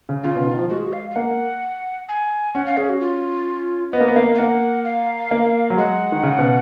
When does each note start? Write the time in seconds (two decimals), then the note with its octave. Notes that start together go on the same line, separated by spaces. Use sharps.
0.09 C#3
0.23 C#3 F4
0.36 B2
0.47 D#3
0.59 F3
0.70 G#3 F#4
0.77 G#4
0.85 F#4
0.93 F5
1.11 F5
1.16 A#3 F#5
2.09 G#5
2.55 C#4 F#5
2.66 F5
2.77 C#4 G#4
2.89 F#4
3.01 F4
3.92 B3 D#5
4.00 A#3
4.08 B3
4.16 A#3 F5
4.35 F5
4.38 A#3 F#5
4.85 F5
5.31 A#3
5.70 F#3
5.77 G#3 F#5
6.12 D#3
6.23 C#3
6.39 B2